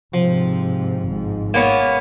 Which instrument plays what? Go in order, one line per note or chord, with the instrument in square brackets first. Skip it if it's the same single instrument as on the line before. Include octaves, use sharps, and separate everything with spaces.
[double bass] G#2 C3 [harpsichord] F3
[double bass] G#1 G#2
[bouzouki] A#3 B3 C#4